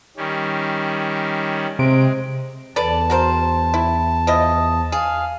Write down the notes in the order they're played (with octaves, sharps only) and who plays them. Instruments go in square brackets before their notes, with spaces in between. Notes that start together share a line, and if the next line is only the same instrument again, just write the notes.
[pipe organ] D#3 G3 C#4
[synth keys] C3 D7 [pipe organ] G#3
[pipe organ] E2 A5 [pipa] A4 B4 D5
[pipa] F#4 A#4 C5
E4
F3 E4 D#5
[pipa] G#4 [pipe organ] F5